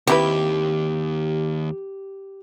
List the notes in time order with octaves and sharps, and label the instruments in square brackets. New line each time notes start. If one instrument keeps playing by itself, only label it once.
[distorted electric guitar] D#2 [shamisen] C4 E4 B4 [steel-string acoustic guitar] G4